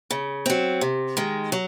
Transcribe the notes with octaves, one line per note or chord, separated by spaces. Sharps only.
C#3
F#3 C4
C3
D#3 G#3
F#3